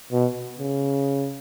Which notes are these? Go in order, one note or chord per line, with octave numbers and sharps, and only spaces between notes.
B2
C#3